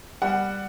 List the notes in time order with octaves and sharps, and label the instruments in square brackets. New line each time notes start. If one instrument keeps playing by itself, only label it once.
[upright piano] G3 F#5